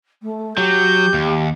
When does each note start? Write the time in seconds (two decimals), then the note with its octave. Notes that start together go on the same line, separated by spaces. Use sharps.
0.23 A3
0.58 F#3 G4 G6
1.14 D#2